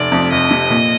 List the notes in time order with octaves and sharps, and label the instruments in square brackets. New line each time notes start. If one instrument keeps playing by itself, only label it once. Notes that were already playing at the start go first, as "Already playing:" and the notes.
Already playing: [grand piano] F1 [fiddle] D5
[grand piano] F2
[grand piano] F1 [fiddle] D#5
[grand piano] C3
A#2